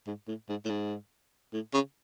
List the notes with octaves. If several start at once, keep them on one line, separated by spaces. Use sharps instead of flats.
G#2
A2
G#2
A2
G#2
A2
C#3